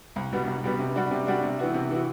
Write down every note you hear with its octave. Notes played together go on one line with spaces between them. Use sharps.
C2
B2 G3 B3
C2
B2 G3 B3
C3
G3 D4 F#4
C3
G3 D4 F#4
C3
E3 B3 F#4
C3
E3 B3 F#4